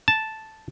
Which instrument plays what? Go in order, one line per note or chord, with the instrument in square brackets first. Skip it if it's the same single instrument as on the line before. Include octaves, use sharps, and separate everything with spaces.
[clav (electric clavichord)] A5